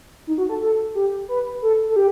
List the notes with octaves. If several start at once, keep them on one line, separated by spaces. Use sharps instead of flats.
D#4
F#4
A4
A4
G4
B4
A4
A4
G4